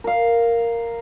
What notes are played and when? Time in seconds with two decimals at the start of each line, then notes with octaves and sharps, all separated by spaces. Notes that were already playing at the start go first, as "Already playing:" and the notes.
0.04 A#4 F5